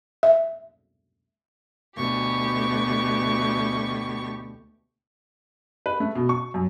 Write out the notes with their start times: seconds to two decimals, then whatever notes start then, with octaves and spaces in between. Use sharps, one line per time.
0.23 E5
1.95 D2 B2 G4 C#6
5.86 B4
6.00 A3
6.15 B2
6.29 C#6
6.54 F#2